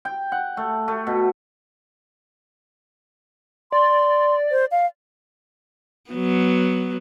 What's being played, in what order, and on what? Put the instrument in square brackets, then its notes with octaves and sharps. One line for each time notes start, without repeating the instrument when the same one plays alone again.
[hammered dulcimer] G5
F#5
A3
A3
B2
[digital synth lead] D5 [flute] C6
[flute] C5
F5
[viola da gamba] F#3 B3